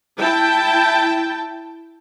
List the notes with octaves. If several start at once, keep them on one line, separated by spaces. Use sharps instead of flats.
E4 G5 A5